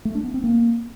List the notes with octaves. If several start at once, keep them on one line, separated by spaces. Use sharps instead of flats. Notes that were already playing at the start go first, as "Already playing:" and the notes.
A3
D4
B3
C4
A#3